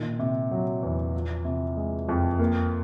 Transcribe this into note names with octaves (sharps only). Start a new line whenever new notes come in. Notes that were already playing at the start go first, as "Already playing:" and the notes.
Already playing: A#2 D#3
C3
F#3
E2
F3
C3
G#3
F2
A#3